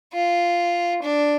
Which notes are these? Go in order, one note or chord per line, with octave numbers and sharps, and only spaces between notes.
F4
D4